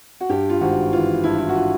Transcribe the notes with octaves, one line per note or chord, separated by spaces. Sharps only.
F#4
G2 G4
F4
G#1 F#4
E3 F4
G2 E4
E4
F#4
F4